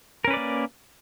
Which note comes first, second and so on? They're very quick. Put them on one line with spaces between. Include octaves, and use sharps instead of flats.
A#4 C#4 B4 D5 A#3